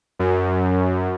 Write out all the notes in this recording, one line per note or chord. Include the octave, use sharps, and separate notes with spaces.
F#2